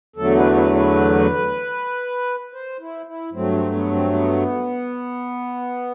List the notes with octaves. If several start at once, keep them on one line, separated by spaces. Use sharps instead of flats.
E2 D3 F#3 A3 A4
B4
B4
B4
C5
E4
E4
G2 F#3 A3 C4
C4
B3
C4
B3